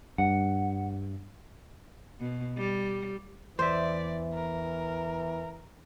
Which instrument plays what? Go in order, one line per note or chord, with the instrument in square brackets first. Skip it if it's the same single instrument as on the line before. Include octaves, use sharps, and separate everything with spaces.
[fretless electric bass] G2 [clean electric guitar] F#5
[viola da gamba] B2
G3
[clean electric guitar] E2 E5 [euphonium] E3 [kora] C5 [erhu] D5
[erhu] A#4